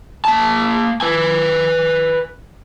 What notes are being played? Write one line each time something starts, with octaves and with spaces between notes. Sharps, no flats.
A#3 A5
B4 G#5